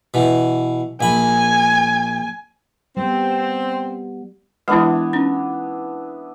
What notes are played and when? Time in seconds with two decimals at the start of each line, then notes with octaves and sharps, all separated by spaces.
0.14 B2 E3
1.01 A#1 G#5 B5
2.97 G3 B3 C4
4.68 E3 G#3 B3 D4 E4
5.13 C#4 D#4